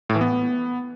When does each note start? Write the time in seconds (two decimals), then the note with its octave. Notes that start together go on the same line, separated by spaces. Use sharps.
0.10 A2
0.15 E3
0.21 B3